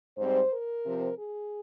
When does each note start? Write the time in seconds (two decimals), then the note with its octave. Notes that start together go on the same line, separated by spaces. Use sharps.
0.18 G#2 G3 C4 C5
0.51 A#4
0.85 C3 F3 C4
1.19 G#4